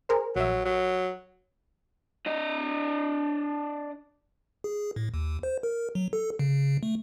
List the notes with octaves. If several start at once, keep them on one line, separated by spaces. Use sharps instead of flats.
G#4 A#4 C5
A#1 F#3 E5
F#3
D4 D#5
G#4
A2
D#2
C5
A#4
F#3
A4
C#3
A3